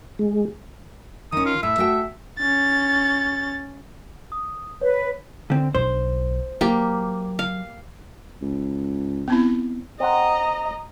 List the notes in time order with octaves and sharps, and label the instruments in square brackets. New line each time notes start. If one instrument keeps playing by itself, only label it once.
[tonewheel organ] G#3
[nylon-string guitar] D#3 C#4 [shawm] D#6
[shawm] F4
[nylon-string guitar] A2 [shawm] E5
[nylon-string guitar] A3 F#4 G5
[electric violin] C#4 A6
[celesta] D#6
[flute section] B4 [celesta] C#5
[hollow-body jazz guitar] D3 C4
[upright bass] B1 D4 [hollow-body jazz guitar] C5
[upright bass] F#3 [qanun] A#3 G4
[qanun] F5
[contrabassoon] C#2
[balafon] B3 C4 E4
[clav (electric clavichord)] C4 F#5 [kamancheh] D#5 A#5